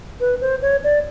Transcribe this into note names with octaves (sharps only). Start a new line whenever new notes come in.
B4
C5
C#5
D5